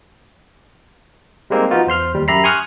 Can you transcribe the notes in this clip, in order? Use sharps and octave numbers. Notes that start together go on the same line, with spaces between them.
G3 G#3 A#3 C4 D#4
F3 B3 D#4 F4 F#4
E2 C5 C6 F6
D#2 G3
F#2 G4 E5 A#5 B5 C7
G#5 C6 C#6 D#6 F6 F#6